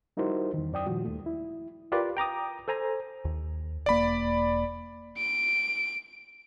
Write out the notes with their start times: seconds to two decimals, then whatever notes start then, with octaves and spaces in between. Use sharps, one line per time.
0.17 G3 D#4 E4 F#4 A#4 C5
0.54 E2 D#3
0.73 F#2 D5 G5 D#6
0.86 A#2 D#3 F3 G3 F#4
1.05 D#2 A3
1.26 E4
1.92 F4 G4 A#4 B4 D5
2.17 G5 A#5 D6 D#6
2.68 A4 C5 G#5 A#5
3.25 D#2
3.86 E1 A#3 D5 B5
5.18 D7